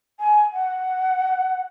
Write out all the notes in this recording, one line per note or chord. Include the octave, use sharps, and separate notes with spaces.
G#5
F#5